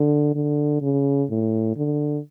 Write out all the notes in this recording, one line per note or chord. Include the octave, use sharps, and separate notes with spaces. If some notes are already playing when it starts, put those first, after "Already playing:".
Already playing: D3
D3
C#3
A2
D3